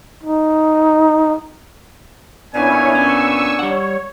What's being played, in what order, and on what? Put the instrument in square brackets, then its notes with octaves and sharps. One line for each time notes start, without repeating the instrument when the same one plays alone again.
[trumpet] D#4
[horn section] A#2 B3 G#5 [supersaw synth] C#4 E4 C#5 [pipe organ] D4
[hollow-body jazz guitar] C#4 [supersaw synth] C#6 E6
[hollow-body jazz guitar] G3 F#5 [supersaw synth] C#5